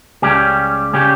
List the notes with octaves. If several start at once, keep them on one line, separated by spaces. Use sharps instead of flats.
C#2 C#3 G3 C#4 G4
C#3 G3 C#4 G4